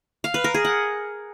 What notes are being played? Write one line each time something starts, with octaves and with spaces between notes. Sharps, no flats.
F5
B4
A#4
G#4
F#5